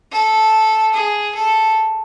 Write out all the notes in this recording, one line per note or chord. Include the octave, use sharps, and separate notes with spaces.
A4
G#4
A4